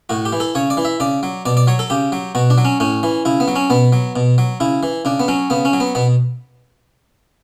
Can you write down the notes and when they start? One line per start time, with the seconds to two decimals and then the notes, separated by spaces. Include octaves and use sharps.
0.09 A2 F#4
0.25 G4
0.33 E3
0.40 A4
0.55 C#3 C#5
0.70 D5
0.77 E3
0.85 E5
1.00 C#3 D5
1.23 F#3
1.45 B2 D5
1.57 D5
1.67 F#3 C#5
1.79 A4
1.90 C#3 G4
2.12 F#3
2.35 B2 F#4
2.50 D4
2.58 F#3
2.65 C#4
2.80 A2 C#4
3.03 E3
3.25 C#3 E4
3.40 B3
3.48 F#3
3.56 C#4
3.70 B2 B3
3.93 F#3
4.16 B2
4.38 F#3
4.60 C#3 E4
4.83 E3
5.05 C#3 D4
5.20 B3
5.28 F#3 C#4
5.50 C#3 B3
5.65 C#4
5.73 F#3
5.80 B3
5.95 B2 B3